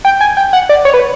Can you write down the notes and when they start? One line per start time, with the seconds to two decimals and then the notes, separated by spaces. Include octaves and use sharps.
0.05 G5
0.21 G#5
0.37 G5
0.53 F#5
0.69 D5
0.85 C#5
0.94 B4